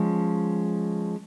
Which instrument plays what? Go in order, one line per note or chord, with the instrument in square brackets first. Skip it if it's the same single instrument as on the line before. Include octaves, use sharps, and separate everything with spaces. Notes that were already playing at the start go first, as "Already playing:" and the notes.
Already playing: [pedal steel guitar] F3 G#3 C#4